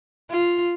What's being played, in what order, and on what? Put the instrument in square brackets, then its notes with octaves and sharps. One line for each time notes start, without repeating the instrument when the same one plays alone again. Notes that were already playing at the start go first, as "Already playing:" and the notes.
[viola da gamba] F4